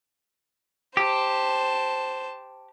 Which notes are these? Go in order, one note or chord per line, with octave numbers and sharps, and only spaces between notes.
G4 C5 A5